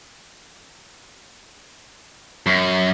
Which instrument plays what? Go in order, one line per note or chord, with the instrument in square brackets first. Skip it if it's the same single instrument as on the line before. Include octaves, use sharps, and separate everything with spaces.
[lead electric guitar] F#2